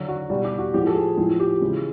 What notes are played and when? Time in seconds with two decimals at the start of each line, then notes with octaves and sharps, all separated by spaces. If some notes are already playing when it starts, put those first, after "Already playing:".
Already playing: D3 F#3
0.08 F#4
0.30 B2 G3 F#4
0.45 G4
0.58 F#4
0.74 A2 F3 G#3 G4
0.87 A4
0.95 G#4
1.17 A2 F3 G#3 G#4
1.40 G4
1.61 C#3 E3 G#3